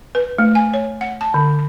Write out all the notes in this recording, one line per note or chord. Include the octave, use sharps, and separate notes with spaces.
B4
A3
G#5
C#5
F#5
A5
D3